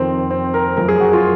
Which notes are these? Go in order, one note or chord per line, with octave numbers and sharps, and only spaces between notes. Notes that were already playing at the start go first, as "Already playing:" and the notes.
Already playing: F2 D#3 C4
C4
A#4
F#2 F3 A#4
G#4
F#4
F4